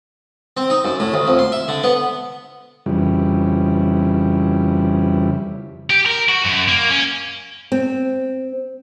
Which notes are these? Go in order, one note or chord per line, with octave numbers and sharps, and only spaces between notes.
C4
D#4
F#2
A2
D2
F2
C6
E5
D3
B3
F2 C#3 E3 G3
G4
A#4
F#4
F#2
A#3
C#4
C4